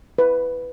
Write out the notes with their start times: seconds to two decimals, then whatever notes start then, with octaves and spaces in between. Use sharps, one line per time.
0.18 B4